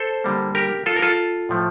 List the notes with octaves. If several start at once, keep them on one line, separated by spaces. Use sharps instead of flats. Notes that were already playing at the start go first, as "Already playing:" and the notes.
Already playing: A4 C5
D3 G3 A#3
G4 A#4
F4 A4
A#4
F4 A4
A2 F3 A3